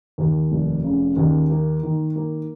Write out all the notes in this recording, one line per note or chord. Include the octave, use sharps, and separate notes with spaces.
D#2
F1
C#3
D#2
A#3
D#3
A#3